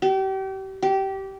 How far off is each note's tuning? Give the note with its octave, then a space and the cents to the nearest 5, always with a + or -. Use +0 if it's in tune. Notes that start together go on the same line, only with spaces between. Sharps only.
G4 -35
G4 -20